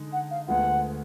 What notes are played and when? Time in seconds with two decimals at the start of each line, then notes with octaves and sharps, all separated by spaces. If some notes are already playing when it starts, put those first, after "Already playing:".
Already playing: D3 G#3 D#4
0.12 F#5
0.30 F5
0.48 D2 D3 G#3 B3 F4 F#5